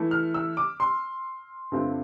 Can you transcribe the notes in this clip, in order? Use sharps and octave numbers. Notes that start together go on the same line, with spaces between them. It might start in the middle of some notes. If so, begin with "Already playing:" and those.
Already playing: E3 A3 E4
F6
E6
D6
C6
G2 D3 A3 C4 F4